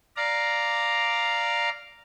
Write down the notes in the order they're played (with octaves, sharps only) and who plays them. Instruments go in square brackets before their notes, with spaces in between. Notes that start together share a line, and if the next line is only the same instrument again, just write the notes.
[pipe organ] D5 F5 A#5